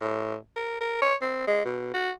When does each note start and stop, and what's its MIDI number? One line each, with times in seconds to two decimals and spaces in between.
0.01 0.36 45
0.56 0.79 70
0.81 0.99 70
1.02 1.15 73
1.21 1.46 60
1.47 1.63 56
1.65 1.91 47
1.94 2.10 66